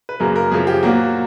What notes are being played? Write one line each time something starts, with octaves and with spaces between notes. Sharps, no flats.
B4
F#2 C#3 F#3 A#3 A#4
A#4
F#2 C#3 F3 G#4
G4
A#2 F#3 A#3 F#4